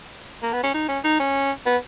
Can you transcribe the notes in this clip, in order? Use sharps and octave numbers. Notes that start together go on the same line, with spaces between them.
A#3
B3
C#4
D#4
C#4
D#4
C#4
B3